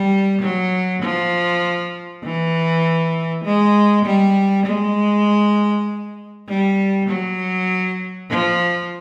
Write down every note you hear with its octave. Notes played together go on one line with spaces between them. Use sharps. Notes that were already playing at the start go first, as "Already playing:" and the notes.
Already playing: G3
F#3
F3
E3
G#3
G3
G#3
G3
F#3
F3